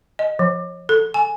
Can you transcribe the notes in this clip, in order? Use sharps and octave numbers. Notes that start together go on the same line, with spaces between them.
D#5
F3
A4
G#5